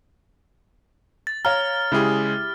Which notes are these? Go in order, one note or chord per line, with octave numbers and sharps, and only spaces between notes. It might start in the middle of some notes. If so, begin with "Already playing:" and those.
A6
C#5 F5 A#5 F6
C#3 G#3 E4 G4 G#4